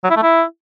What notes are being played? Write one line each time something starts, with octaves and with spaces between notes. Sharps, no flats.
F#3
E4
A3
E4